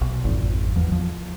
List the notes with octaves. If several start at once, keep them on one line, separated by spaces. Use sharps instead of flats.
B1
G#1 F2
E2 F3
F3